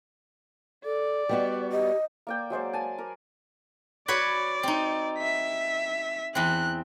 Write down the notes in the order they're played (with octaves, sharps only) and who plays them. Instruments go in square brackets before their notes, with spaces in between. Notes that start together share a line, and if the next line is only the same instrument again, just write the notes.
[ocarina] A4 [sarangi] D5
[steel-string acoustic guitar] G3 B3 F#4 [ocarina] D#5
[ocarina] G4 [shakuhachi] D#5
[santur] A#3 D5 G5
F#3 G#3 C5 D5
G#5 A5
A#4 D5
[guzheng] F#4 B4 C#5 [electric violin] D5
[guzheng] C4 D#4
[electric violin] E5 B6
[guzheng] E2 C4 [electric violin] F#6